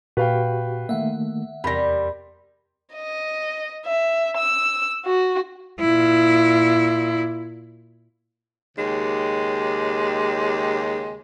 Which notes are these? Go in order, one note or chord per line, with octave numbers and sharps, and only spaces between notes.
A#2 F#4 G4 B4 F5 G5
D#3 A3 A#3 E5 F#5
E2 C3 G3 A#4 B5 A#6
D#5
E5
E6
F#4
A#2 E4
D#2 C#3 G#3 G4